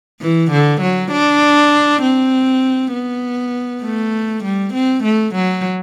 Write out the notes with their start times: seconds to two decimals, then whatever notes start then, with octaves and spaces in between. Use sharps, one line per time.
0.22 E3
0.52 D3
0.82 F#3
1.12 D4
2.02 C4
2.93 B3
3.83 A3
4.44 G3
4.74 C4
5.04 A3
5.35 F#3